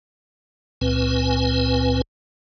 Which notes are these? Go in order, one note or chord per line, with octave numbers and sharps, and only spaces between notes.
C#2 A#2 C4 B4 G#5